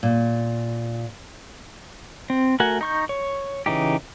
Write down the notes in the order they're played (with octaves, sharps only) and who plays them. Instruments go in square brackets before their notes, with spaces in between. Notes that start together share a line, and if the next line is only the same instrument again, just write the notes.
[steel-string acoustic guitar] A#2
[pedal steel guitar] C4
A3 F#4 A#4 F#5 G#5
D#4 C#6 G6
C#5
C#3 E3 D#4 G4